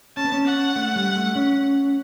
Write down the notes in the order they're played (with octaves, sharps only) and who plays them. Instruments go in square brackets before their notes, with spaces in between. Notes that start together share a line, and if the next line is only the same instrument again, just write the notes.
[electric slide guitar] C#4 [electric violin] A5
[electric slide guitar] B3
C#4
[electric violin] F#5
[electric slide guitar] A3
G3
A3
C#4